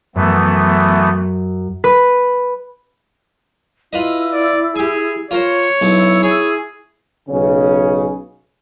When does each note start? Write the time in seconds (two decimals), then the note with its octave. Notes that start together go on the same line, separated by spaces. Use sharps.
0.16 F#2 E3 A3 B3
1.84 B4
3.93 E4 F4 B4 D#5
4.33 D5
4.76 G4 G#4 G#5
5.31 F4 A#4 C5 C#5
5.81 B1 E4
6.23 G#4 C#5
7.28 B1 C#3 C#4